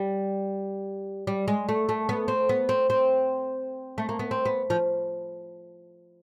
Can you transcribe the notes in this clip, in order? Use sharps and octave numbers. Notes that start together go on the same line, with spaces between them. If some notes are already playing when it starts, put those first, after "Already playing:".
Already playing: G3
G3
G#3
A3
A3
B3
C4
B3
C4
C4
A3
A#3
B3
C4
B3
F3